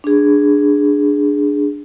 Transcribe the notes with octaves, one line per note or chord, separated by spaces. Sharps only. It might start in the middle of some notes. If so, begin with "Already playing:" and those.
D4 G#4